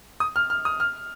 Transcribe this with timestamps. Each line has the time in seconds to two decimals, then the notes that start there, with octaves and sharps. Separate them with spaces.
0.20 D#6
0.36 F6
0.50 F6
0.65 D#6
0.80 F6